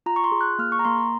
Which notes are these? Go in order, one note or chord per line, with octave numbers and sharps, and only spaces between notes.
F4 A#5
C#6
C6
G#4
F#6
A#3 F6
C#6
A#5
A#3 C6
A#5